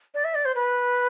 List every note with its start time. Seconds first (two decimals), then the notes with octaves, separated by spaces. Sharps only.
0.14 D5
0.24 E5
0.34 D5
0.45 C5
0.55 B4